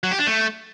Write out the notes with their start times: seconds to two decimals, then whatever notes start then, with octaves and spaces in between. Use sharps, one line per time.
0.03 F#3
0.11 G4
0.19 D4
0.27 A3